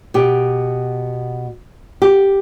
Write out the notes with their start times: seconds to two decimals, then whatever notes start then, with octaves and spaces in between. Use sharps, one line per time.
0.14 B2 G4
2.02 G4